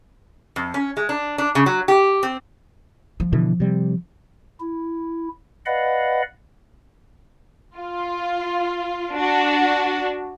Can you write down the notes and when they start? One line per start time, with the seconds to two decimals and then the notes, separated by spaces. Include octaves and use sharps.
0.56 F2
0.74 C#4
0.97 G#3
1.09 D4
1.38 D4
1.55 C#3
1.66 F#3
1.88 G4
2.23 C4
3.20 F3
3.33 B2 D3 E3
3.60 C3 G3
4.60 E4
5.66 B4 D5 D#5 F5 F#5 B5
7.77 F4
9.13 D4 F#4